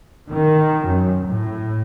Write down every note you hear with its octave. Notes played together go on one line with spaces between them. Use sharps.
D#3
F#2
A2